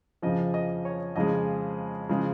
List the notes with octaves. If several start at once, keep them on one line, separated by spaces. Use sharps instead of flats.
F2 C#3 F3 D#5
D#5
C#5
F2 C#3 F3 G#3 D#5
C#3 F3 G#3